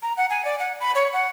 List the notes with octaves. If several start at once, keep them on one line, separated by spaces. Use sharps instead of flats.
A#5
F#5
G#5
D5
F#5
B5
C#5
F#5